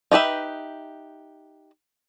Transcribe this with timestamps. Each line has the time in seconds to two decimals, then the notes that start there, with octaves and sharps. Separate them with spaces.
0.12 D#4 G4 B4 E5